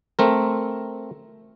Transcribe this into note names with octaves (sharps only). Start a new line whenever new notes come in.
A3 C4 A#4